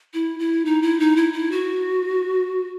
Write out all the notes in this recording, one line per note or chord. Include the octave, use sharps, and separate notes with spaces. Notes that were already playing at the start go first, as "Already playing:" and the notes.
E4
E4
D#4
E4
D#4
E4
E4
F#4